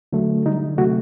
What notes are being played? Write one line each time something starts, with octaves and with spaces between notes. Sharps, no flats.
D3 F#3 A3
D3 G3 D#4
C3 F#3 A3 F#4